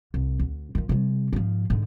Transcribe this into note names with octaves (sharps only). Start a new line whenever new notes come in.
C2
D2
D#3 F3
C3 G3
G#2 F3
G#2 D3